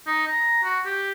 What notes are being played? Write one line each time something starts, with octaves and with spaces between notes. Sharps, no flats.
D#4
A#5
F#4
G4